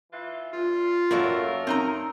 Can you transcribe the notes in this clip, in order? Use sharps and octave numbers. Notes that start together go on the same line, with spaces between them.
E3 F4
G2 F4
F#2 A3 A#3 F#4 A4 A#4 D5 F5
C4 D#4 A#5